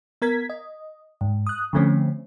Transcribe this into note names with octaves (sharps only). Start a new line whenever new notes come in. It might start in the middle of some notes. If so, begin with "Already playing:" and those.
B3 A#4 G#6 B6
D#5
G#2
D#6 F#6
D3 F3 A3 C4 C#4